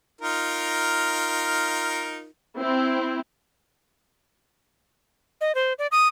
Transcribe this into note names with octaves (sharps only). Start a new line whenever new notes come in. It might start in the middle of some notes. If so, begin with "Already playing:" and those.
D#4 F4 A#4
C4 E4
D#5
C5
D5
D#6